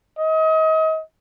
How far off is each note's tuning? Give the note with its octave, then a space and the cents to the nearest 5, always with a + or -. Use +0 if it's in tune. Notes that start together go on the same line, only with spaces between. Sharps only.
D#5 +35